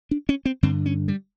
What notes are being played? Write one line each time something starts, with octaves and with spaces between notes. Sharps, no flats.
D4
C#4
C4
G2 D3 C4
C#4
G3